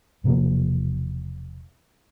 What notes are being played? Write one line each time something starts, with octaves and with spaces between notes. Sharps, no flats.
E1 C3 F3 A#3